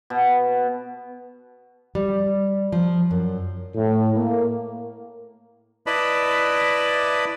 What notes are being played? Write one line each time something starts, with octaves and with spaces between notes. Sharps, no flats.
B2
G3
F3
F#2
A2
A#3
E4 B4 D5 D#5 A5 B5